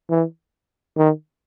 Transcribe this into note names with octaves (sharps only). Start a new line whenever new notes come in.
E3
D#3